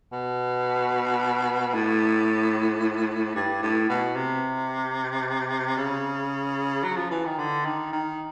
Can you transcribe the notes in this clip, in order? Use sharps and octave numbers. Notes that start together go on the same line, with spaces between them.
B2
A2
G2
A2
B2
C3
C#3
F#3
F3
E3
D#3
D3
D#3
D#3